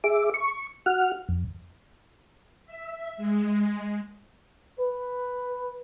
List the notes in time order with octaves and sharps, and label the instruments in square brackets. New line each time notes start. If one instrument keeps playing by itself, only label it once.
[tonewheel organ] G#4 E5 D6
C#6
F#4 F#5 F6
F2
[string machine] E5
G#3
[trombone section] B4